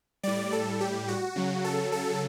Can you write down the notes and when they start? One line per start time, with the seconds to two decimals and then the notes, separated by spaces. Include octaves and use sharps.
0.23 A2 G3 D5
0.53 A4
0.81 G4
1.08 F#4
1.36 C#3 F#3
1.64 A4
1.92 A4